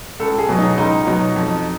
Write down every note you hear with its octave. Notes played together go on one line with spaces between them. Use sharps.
C#2 A4
G#4
B2 F#3
D#4
C#2 D#4
B2 F#3
F2